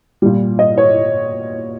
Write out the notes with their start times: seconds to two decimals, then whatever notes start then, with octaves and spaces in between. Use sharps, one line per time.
0.22 A#2 G3
0.59 D#5
0.78 C#5